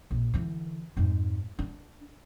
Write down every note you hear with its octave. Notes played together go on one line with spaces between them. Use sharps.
A#1
D3 E3
F2 G#2
D4